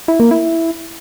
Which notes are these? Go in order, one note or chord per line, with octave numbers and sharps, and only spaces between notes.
E4
A#3
E4